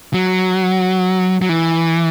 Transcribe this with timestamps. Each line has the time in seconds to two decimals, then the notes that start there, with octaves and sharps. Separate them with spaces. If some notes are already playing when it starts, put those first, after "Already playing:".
0.14 F#3
1.42 F#3
1.49 E3